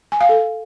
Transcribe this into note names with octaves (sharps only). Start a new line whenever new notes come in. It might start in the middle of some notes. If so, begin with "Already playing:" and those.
G#5
F5
A4